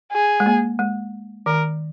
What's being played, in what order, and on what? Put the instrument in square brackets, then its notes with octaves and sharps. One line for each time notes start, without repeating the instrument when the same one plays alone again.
[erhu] G#4
[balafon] G#3
A#3
G#3
[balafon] D#3 [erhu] A#4